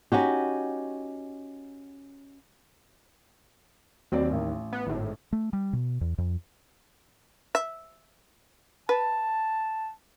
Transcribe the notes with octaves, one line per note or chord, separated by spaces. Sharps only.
C#4 D#4 F#4 G4
D#2 F#3 C4 D5
A1
B3
G#1 A2
A3
G3
B2
E2
F2
E5
B4 A5